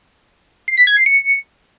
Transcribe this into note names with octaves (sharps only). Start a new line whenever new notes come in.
C7
B6
G#6
C7
C#7